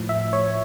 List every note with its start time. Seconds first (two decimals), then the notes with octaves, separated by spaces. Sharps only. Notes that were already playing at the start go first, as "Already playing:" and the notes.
Already playing: A2 F3
0.09 E5
0.33 C#5